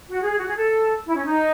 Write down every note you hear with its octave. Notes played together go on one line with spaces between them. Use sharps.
F#4
G#4
F#4
G#4
A4
E4
C#4
D#4